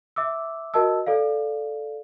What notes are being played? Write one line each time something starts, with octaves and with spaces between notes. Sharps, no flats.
E5 D6 E6
F#4 A#4 D#5 A5 E6
A4 D5 F5